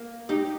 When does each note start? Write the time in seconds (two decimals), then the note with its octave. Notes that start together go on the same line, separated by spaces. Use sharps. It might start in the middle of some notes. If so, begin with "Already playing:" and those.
Already playing: A#3
0.29 D#4 G4